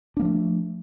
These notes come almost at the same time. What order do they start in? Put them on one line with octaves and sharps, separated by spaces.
D4 A#3 F3 A3